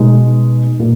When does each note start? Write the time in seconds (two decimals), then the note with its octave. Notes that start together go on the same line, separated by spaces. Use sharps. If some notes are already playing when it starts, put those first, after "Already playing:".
Already playing: B2 G#3 D#4
0.80 A#2